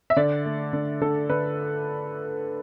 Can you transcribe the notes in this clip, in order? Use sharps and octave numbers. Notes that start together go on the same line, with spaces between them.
E5
D3 D5
A3
D3
D3 A4
D3 B4